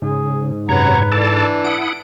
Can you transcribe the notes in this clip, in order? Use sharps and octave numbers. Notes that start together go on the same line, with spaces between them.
G#2 C#3 G#4
F#2 C3 B4 C#5 F#5 A#5
E3 A4 D5 A5
D4
E4 F#5 D#6 D7